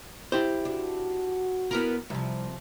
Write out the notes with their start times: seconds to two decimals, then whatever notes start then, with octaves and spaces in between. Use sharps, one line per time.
0.32 E4 G4 C5
0.65 D4 F#4
1.71 B3 E4 A#4
2.10 C2 C3 F3